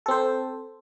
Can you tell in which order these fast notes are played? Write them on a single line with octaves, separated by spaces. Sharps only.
A4 C4 C5